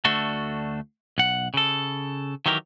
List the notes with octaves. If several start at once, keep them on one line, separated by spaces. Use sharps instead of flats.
D2 A3 D4 F#4 A4
B1 F#5
C#3 A4
D#3 E3 F#3 G4 A#4